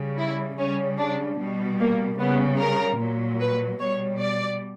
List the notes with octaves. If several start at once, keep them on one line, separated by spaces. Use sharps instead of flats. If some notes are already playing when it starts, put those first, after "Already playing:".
Already playing: C#3 G3
E4
C#3 G3 C#4
D4
B2 G3
A#3
C#3 G3 B3
A#4
A#2 F#3
B4
B2 G3 C#5
D5